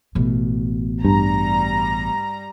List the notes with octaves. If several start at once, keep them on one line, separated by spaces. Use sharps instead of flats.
A1 B2
G2 G3 A#5